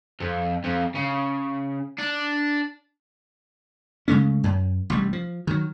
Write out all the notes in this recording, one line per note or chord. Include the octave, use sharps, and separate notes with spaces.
F2
F2
C#3
D4
C#3 G#3 A3 C#4
F#2
A1 C3 G3
F3
D#3 F#3